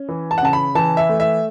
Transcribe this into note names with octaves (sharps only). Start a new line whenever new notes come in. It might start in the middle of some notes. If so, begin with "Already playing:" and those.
Already playing: C#4
E3
A5
F#5
C#3 A5
B5
E3 A5
E5
A3
E5